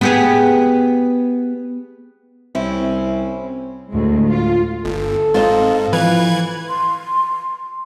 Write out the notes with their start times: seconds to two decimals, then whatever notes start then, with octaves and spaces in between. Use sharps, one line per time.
0.01 B3 G4 G#4
2.55 C2 C4 C#4 E4
3.90 D2 A2 G#3
4.28 F4
4.85 G1 A4
5.34 G#2 C4 F4 C5 D#5
5.93 E3 F3 B4 F5 G#6
6.69 C6